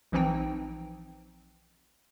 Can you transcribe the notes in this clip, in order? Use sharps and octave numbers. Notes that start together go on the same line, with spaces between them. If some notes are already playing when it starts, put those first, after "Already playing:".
A#1 E3 F3 C4 D#4 G5